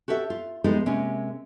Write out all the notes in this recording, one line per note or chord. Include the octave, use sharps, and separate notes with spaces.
F#4 G4 A4 E5
F4
F3 G#3 B3 D#4 G4 A4
C3 G#3 A#3 C#4